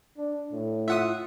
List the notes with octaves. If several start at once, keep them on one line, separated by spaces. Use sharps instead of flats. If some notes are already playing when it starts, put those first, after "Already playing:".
D4
A2
F4 E5 F#5 D#6